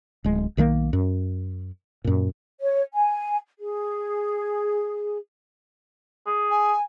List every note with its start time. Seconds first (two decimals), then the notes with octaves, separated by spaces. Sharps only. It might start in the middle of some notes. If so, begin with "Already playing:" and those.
0.24 D1 G#3
0.57 B1 D#3 A3 A#3
0.93 F#2
2.04 F#2 A#2
2.61 C#5
2.93 G#5
3.59 G#4
6.27 G#4
6.51 G#5